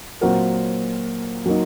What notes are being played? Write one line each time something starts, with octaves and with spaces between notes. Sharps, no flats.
A#2 F#3 C4 F#4 A#4
F#3 A#3 D#4